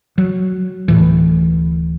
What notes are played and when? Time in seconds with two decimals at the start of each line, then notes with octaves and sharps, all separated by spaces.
0.18 F#3
0.88 D1 A2 E3